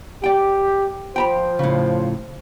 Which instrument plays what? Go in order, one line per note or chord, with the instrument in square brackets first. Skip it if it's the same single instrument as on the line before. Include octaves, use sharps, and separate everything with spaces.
[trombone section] G4 [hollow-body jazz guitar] D5 G5
[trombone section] F3 C5 [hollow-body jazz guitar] G5 A#5 B5
[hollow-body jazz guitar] A2 C#3